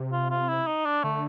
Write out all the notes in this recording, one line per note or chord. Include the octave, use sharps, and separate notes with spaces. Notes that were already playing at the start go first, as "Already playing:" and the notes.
Already playing: C3
F4
F4
E4
D#4
D4
D3 A3